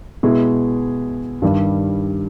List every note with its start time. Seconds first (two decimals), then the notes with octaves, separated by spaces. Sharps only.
0.23 B2 G#3 B3 E4 G#4
1.42 G2 D#3 G3